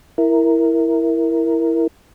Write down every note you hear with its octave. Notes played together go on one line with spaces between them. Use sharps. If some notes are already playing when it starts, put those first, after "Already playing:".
E4 A#4